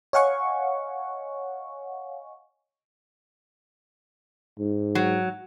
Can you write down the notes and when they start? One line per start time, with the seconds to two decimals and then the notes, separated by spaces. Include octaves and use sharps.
0.13 C#5 D#5 F5 F#5 G#5 C#6
4.59 G#2
4.95 F#3